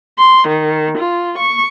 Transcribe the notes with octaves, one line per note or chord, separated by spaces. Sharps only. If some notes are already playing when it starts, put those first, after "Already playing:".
C6
D#3
F4
C#6